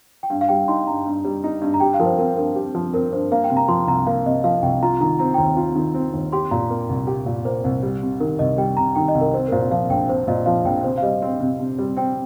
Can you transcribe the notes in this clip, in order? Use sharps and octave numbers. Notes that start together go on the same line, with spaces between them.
G5
G2 F5
F5
G3 G5
D#4 C6
G2 A#5
G2
G3
D#4
G2
A#5
G4 G5
F5
F3 A#4
C5
C4 A#4
G2 A#4
G4
F3
C4 A#4
G2 C5
A#3 F5
G5
C3
A#5
F3 C6
C2 A#5
A#3 F5
C3 D#5
F3 F5
C2 G5
F4 A#5
D#3 A#5
C4 A#5
G5
D#2 A#5
F4
D#3
C4
D#2
G4 C6
A#2 A#5
A#3
C2
G4
A#2
A#3 C5
C2
G3
C3
D#3 A#4
C2 D#5
G3 G5
C3 A#5
D#3 G5
D#5
C2
A#4
C4 C5
A#4
A#2 C5
F3 F5
A#1 G5
C4 C5
A#2 D#5
F3 F5
A#1 G5
C3 C5
F5
G3 D#5
C4
C3
C3
G3
C4 G5